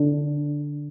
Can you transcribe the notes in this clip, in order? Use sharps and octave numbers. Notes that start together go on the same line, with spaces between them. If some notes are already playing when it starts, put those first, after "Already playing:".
Already playing: D3